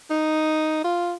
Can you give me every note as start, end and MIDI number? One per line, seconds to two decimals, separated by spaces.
0.10 0.80 63
0.84 1.13 65